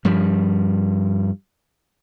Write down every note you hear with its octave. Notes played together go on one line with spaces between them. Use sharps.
G2 F3 G3